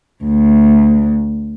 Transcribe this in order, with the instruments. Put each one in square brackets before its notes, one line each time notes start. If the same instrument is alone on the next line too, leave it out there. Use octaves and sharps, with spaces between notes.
[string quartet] D2